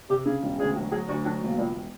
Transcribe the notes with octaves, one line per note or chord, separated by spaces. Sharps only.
C3 G4
C#3 G#4
E1
D2 G#4
F#3
F#3 G#4
D2 F#4
F#3 D4
E1 A#3
C#2